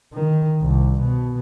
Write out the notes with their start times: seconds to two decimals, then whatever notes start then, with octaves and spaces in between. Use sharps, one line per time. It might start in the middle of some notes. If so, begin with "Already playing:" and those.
0.14 D#3
0.62 C2
1.01 B2